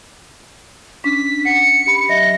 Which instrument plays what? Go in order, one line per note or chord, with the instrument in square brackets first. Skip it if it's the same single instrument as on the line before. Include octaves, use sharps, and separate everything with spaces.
[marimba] C#4 D4 [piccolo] B6
[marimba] F#5 [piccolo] C#7
[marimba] G4 B5
[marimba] F#3 D#5 E5 [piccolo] A#6